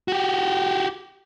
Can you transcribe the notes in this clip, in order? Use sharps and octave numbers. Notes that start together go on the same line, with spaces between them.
F#4 G4